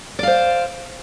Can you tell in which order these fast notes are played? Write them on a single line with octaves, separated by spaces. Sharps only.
D5 F5 C5